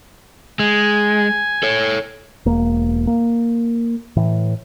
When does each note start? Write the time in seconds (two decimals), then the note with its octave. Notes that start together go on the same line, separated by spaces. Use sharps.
0.59 G#3 G#5
1.63 A4 C#5
2.46 E1 A#3
3.07 A#3
4.16 A2 E3